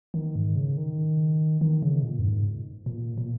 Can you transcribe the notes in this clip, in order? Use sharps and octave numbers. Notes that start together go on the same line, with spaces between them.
D#3
G#2
C#3
D#3
D#3
C#3
A#2
F2
G#2
A#2
A#2